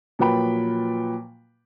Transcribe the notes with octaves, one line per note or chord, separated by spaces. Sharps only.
A#2 F3 F#3 B4 G5 B5